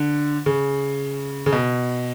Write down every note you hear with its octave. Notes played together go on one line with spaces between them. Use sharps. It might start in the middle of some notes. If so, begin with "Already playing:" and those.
Already playing: D3
C#3
C#3
B2